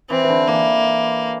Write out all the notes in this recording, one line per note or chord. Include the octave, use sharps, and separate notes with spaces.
E3 C4
E3
D3
E3 A#3